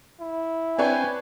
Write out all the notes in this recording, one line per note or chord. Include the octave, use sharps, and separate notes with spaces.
E4
C4 D4 B4 C#5 G5 G#5